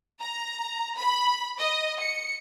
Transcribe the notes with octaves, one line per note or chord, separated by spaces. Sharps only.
A#5
B5
D#5
C#7